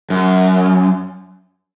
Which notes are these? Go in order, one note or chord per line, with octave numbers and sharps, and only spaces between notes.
F#2